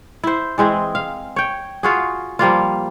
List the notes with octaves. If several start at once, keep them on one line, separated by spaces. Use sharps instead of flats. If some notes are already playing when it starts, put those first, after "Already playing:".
E4 C5
E3 G#3 C4 G#4
F5
C#5 G5
F4 F#4 G#4
F3 G3 A#3 F4